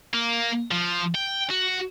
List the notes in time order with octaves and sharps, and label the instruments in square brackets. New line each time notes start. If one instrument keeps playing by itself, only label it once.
[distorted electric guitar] A#3
F3
G5
F#4